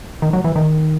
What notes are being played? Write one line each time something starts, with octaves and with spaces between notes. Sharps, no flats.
D#3
F#3
E3
D#3